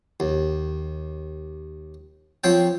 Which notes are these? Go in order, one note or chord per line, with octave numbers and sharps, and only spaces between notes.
D#2
F3 C4 C#5 G5